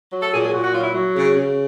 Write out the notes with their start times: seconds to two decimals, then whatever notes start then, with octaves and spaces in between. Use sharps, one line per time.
0.12 F#3
0.23 A4
0.32 A#2 G#4
0.43 G#4
0.53 A#2 F#4
0.63 F#4
0.73 F#3 F4
0.84 E4
0.95 F#3
1.15 C#3
1.35 C#3